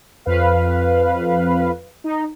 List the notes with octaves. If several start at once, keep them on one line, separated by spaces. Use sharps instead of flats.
F2 B4 F5
D#4